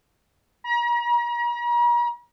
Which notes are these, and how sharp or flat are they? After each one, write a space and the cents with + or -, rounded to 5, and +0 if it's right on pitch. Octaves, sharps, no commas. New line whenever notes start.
A#5 +40